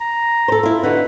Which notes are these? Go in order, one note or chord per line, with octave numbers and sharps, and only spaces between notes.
A#5
A4 C5
E4 F4
D3 D#4 F#4 B4